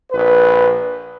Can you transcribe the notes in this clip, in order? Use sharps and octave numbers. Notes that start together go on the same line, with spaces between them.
A#1 B4